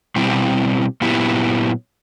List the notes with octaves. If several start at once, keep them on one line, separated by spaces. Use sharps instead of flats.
B2 G3 C4 E4 G4
A#2 F#3 B3 E4 G4